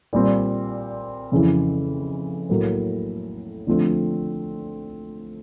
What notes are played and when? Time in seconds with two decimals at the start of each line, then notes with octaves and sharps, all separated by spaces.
0.13 A#2 G3 C4
1.32 F2 C#3 E3
2.49 A2 F#3 A#3
3.67 D3 F3 A3 C4